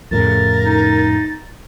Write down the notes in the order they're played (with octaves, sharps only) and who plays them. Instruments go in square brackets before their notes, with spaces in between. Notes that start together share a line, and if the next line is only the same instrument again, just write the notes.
[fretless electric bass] F2 A2 C#3 [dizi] A#4 [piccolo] A6
[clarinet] D#4